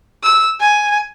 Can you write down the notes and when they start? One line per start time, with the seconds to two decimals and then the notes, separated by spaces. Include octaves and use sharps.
0.23 E6
0.60 G#5